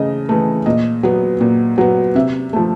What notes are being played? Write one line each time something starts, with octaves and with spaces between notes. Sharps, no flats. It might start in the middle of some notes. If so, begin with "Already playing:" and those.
Already playing: C#3 E3 A3 D#5
E3 A3
A#2 D#5
F#3 B3
A#2
F#3 B3
C3 E5
F3 A3